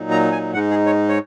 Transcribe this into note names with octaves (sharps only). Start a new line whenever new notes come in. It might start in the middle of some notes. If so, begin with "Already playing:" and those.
Already playing: A#2 F#3 D#4
A#5
G#5
G#2 G#3 D#4 F#5
G#4
C#5
C#5